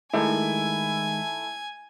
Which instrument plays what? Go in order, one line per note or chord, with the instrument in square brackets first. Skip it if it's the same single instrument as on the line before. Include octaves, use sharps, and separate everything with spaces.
[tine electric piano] D#3 G#3 D#4 [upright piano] A3 E4 [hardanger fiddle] G#5